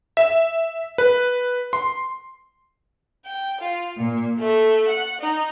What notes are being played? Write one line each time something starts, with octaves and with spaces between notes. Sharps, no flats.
E5
B4
C6
G5
F4
A#2
A3
F#5
D#4